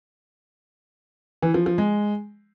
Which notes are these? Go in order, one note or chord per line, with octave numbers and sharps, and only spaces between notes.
E3
F3
F3
G#3